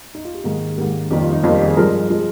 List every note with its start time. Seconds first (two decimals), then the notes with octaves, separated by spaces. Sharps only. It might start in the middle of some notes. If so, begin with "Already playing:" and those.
0.15 D#4
0.25 F4
0.34 G4
0.44 G#2 D#3 A#3 G#4
0.78 G#2 D#3 A#3 G4
1.10 F2 D#3 G3 A#3 G4
1.22 F4
1.32 D#4
1.44 F2 D#3 G3 A#3 F4
1.55 G4
1.66 G#4
1.77 G2 F3 G#3 A#4
2.10 F3 G#3